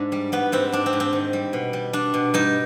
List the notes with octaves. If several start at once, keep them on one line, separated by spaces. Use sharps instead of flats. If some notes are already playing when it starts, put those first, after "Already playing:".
Already playing: G#2 D4
G3
G3 B3
G#2 C4
G#2 D4
C4
G#2
C4
D#3
G3
B2
G3
G3 D4
B2
G2 D#4